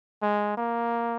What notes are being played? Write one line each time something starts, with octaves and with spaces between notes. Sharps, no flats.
G#3
A#3